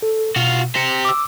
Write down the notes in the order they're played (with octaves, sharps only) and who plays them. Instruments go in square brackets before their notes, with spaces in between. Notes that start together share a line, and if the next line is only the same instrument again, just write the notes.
[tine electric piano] A4
[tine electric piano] B2 [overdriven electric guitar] F4 F#4
[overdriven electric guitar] G4 C5 [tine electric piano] A#6 C#7
[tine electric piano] D6 E6